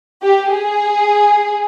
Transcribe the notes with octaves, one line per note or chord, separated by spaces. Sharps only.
G4
G#4